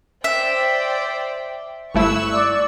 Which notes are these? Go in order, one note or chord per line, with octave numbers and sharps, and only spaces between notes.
C5 D5 E5 G5
G1 A3 E4 C#6 E6 F#6
D5